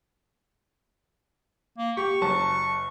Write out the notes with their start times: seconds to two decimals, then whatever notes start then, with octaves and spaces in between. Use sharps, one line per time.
1.78 A#3
1.97 G4 C#6
2.21 F#1 F#3 A5